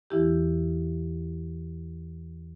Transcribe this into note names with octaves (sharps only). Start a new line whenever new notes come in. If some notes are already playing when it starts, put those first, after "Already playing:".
E2 E3 E4 G4